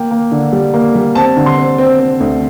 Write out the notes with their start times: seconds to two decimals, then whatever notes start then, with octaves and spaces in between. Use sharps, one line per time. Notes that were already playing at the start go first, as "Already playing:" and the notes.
Already playing: A#3 G5
0.11 A#3
0.32 D3
0.52 G3
0.74 A#3
0.95 G3
1.15 C4 A5
1.37 D3
1.46 C6
1.57 C4
1.78 C4
1.99 C4
2.20 D2